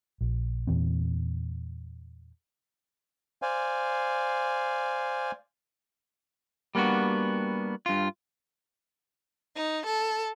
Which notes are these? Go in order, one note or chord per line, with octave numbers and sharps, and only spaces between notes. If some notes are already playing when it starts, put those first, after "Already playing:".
A#1
E2 A#2 E3 C4
C5 D5 F5 G#5
G3 A#3 B3 D4 F#4
G2 F4
D#4
A4